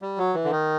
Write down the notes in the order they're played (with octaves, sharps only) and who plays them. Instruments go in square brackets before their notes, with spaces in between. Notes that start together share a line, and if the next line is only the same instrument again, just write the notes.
[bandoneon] G3
F#3
E3
D3
D#3